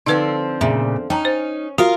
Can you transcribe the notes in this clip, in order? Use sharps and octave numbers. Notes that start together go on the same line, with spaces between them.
D3 F3 C4 D#4 B4
A#2 C#3 E5
C#4 D#4 G5 A5 A#5
C5
F4 F#4 A#4 F5